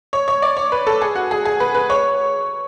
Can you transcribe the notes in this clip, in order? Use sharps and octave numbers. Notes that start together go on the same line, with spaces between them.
C#5
C#5
D5
C#5
B4
A4
G#4
F#4
G#4
G#4
B4
B4
C#5